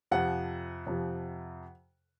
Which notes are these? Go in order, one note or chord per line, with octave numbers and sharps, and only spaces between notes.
F2 C3 F3 F#5
F2 C3 F3